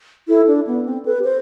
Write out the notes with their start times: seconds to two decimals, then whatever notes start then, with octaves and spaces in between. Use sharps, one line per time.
0.28 E4 A4
0.47 D4
0.67 B3
0.85 C4
1.05 A4 B4
1.19 G4
1.24 C5